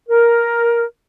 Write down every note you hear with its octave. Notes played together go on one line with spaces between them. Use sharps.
A#4